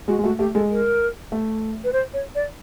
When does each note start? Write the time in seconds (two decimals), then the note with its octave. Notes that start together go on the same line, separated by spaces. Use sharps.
0.08 G#3 F#4
0.19 G#3
0.24 A3 F#4
0.39 A3 G4
0.55 G#3 A4
0.70 A#4
1.32 A3
1.84 B4
1.93 C5
2.13 C#5
2.35 D5